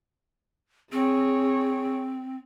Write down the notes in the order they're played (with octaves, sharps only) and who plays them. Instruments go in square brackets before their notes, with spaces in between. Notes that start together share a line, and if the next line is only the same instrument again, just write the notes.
[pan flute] C4 [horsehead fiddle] G#4 C#5